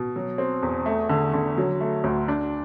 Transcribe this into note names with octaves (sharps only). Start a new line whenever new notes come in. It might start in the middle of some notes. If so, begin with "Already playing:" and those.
Already playing: B2
F#3
C4
E2
A3
D3
D3
F#3
A3
D2
D4